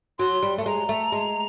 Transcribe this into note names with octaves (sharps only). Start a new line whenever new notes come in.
F#3 C6
G3
A3
G#3 A#5
A3
G#3